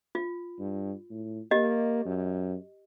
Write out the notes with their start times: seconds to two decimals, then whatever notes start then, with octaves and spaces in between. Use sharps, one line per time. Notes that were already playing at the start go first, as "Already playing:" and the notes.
0.15 F4
0.59 G2
1.10 A2
1.51 A#3 G4 D#5
2.05 F#2